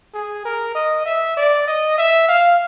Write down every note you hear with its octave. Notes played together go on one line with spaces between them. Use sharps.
G#4
A#4
D#5
E5
D5
D#5
E5
F5